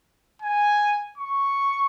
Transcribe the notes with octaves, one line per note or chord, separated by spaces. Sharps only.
G#5
C#6